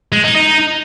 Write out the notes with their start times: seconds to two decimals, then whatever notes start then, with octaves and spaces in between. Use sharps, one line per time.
0.12 G#3
0.24 D#4
0.36 D#4